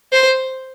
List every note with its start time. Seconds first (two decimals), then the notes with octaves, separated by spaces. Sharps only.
0.12 C5